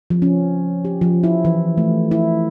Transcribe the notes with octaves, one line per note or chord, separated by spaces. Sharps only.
F3
C#4
G4
F3
E4
E3
A3
E4